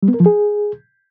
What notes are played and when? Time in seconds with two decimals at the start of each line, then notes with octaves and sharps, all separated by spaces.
0.03 G3
0.08 B3
0.14 A#4
0.20 F3
0.26 G#4